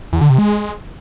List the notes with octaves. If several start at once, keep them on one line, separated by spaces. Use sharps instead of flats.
E2
D3
C3
G#3